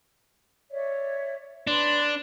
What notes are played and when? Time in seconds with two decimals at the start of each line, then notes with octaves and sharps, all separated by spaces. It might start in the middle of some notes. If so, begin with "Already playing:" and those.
0.71 C#5 D5 E5
1.67 D4 B4 C6